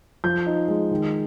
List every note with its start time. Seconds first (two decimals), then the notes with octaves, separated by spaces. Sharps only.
0.24 F3 G6
0.46 D#4
0.68 G#3
0.91 D#3